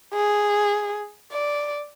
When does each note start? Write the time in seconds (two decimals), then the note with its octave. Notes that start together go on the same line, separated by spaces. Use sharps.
0.14 G#4
1.32 D5